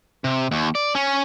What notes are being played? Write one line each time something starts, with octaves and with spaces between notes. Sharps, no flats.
C3
D#2
D5
C#4